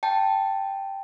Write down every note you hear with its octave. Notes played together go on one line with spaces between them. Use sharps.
G5 A5